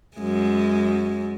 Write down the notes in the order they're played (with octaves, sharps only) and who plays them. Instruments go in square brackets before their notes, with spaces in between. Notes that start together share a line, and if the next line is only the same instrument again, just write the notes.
[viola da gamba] F#2 G#3